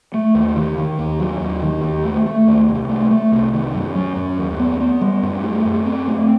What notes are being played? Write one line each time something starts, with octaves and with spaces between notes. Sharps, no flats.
A3
D#2
D#3
D#3
D#2
F#3
D#2
D#3
D#2
A3
A3
D#2
C2
A3
A3
C2
D#3
F#2
F#3
F#2
D#2
B3
B3
G3
F#2
A3
F#2
C4
A3